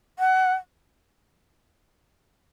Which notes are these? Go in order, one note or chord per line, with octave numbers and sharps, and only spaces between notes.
F#5